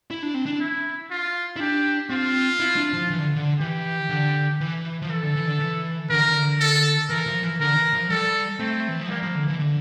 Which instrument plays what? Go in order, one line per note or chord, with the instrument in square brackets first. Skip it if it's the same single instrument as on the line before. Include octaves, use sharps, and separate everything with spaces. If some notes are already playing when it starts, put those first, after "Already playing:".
[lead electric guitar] E4
D4
C4
D4
[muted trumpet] E4
F4
[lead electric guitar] E4
[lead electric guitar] D4 [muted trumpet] G4
[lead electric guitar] C4 [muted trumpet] F4
[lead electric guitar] E4
D4
F3
E3
D3
D3
[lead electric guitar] E3 [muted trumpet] G4
[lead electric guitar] D3
E3
F3
[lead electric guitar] E3 [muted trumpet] A4
[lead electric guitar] D3
E3
D3
E3
[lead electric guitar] D3 [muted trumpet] A#4
[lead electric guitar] E3
D3
[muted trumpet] A4
[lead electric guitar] E3 [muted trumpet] A#4
[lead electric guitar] F3
E3
[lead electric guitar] D3 [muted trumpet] A#4
[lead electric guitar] E3
F3
[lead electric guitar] G3 [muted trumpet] A4
[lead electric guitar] A3 [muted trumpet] C4
[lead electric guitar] E3
F3
[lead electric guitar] G3 [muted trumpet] A#3
[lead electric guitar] F3
D3
E3
D3